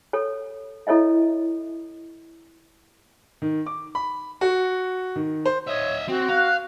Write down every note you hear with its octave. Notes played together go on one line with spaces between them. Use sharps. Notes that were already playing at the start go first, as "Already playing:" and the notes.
A4 C#5
E4 A4 C#5 D#5 E5
D#3
D6
B5
F#4
D#3
C5
C#5 D#5 E5
C4 F#4
F5 F#6